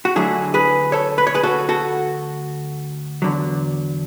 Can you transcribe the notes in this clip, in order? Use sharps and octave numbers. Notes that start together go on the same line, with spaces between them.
F#4
D2 D3 F#3 A3 D4 E4 G#4
G#4 B4
A4 C#5
B4
C#5
G#4 B4
F#4 A4
F#4 A4
E2 D3 F#3